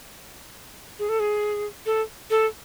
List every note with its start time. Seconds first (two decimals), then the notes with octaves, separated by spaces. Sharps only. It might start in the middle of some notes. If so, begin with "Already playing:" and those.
0.99 G#4
1.09 A4
1.20 G#4
1.86 A4
2.30 A4